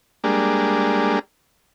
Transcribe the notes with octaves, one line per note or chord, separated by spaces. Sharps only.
G3 G#3 A#3 D4